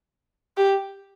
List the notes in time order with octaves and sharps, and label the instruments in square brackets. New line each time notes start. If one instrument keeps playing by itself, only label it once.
[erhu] G4